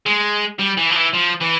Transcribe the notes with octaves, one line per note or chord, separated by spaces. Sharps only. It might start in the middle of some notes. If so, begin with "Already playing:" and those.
G#3
G3
E3
F3
E3
F3
E3